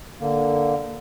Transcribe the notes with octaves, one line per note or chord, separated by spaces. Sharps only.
D3 A#3